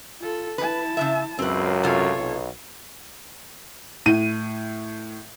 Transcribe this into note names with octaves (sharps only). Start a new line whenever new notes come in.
F4 A4
E4 B4 A5
C#3 F3 E5
C#2 F#2 C4 B4
C3 F4 A4 C#5
B1
A2 D#7